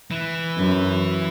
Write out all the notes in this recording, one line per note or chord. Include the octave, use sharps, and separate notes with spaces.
E3
F#2